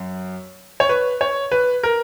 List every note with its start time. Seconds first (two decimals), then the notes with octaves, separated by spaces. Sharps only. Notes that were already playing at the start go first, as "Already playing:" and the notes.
Already playing: F#2
0.80 C#5
0.89 B4
1.21 C#5
1.52 B4
1.83 A#4